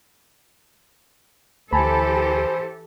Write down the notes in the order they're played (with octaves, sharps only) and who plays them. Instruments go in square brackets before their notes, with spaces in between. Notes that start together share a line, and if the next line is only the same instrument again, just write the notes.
[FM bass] D2 [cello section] E3 G4 A4 [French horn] C5 [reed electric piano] G#5 A5 B5